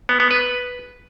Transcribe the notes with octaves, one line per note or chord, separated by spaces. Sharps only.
B3
B3
B4